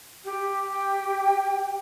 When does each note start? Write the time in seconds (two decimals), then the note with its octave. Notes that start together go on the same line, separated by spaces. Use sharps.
0.25 G4
0.68 G5